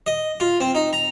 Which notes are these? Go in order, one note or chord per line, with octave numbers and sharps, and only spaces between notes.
D#5
F4
C4
D#4
A#5